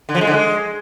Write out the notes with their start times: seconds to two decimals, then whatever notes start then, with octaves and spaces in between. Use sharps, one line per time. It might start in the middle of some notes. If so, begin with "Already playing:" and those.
0.09 D3
0.15 F3
0.21 G#3
0.27 D3
0.33 G#3